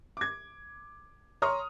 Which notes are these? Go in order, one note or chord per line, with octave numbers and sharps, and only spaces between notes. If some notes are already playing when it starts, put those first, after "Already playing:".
D6 G#6
C#5 A#5 C6 C#6 D#6 F6